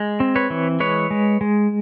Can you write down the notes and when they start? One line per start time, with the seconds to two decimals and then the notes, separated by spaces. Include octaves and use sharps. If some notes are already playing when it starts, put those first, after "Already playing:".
Already playing: G#3
0.20 C4
0.36 B4 C#5
0.50 E3
0.80 G#3 B4 C#5
1.10 G#3
1.41 G#3